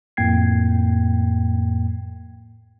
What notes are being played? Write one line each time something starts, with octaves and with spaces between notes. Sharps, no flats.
F2 A2 A#3 G5 G#6 C7